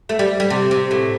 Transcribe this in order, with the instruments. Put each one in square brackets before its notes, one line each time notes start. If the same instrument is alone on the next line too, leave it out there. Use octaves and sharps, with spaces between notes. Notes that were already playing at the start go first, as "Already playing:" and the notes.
[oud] A3
G3
G3
C3
C3
A2